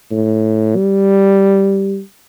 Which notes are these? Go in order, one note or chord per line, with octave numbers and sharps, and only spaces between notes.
A2
G3